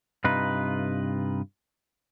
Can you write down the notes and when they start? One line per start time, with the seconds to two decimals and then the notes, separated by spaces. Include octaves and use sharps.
0.24 G2 C3 D#4 F4 B4